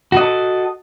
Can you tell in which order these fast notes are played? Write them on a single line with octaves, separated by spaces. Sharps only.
F#4 D#5 A4